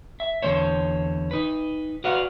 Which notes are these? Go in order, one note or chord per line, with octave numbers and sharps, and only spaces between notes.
E5
E2 D3 A3 C5 C#5
D#4 B4
F#4 B4 D5 F5 F#5